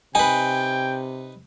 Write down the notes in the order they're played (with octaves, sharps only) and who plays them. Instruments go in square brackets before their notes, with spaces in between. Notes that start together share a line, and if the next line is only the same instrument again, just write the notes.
[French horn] C3 [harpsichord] D#4 B4 [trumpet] G5 [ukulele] G#5